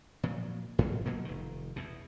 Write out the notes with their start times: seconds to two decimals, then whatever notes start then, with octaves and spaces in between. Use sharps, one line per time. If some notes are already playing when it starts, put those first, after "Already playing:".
0.23 A#2 F3 F#3
0.79 G#2 B2 F#3
1.06 B2 F#3 A#3
1.25 F1 D#3
1.76 E2 B2